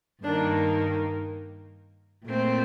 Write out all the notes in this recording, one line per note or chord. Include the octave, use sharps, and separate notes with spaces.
G2 D#3 A#3 D4
A#2 A3 C4